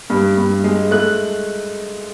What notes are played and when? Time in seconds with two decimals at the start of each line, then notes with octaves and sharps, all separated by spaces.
0.10 G2
0.38 G2
0.64 G#3
0.91 A3 F#6